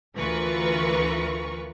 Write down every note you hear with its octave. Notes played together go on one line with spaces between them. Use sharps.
D2 E3 F4 A#4 B4 C#6